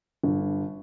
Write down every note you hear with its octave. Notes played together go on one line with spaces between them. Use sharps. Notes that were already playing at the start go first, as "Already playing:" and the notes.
G1